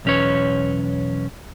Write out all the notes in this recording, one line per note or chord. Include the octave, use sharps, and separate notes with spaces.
B1 E2 C#4 B4 C#5